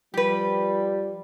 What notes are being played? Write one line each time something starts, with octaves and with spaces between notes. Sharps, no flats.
F3 G3 G4 B4